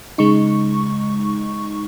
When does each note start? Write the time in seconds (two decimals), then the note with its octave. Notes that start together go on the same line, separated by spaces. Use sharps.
0.18 C#3 G#3 D#4 C#6